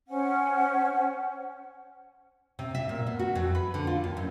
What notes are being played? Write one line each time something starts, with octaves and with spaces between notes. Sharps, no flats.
C#4 C5 F#5
C3
E5
A#2
B3
F#4
F2
B4
D3
F4
D#2
F#2